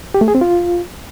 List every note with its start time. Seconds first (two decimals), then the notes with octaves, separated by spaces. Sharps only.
0.14 G4
0.21 A3
0.28 G#4
0.35 C4
0.41 F4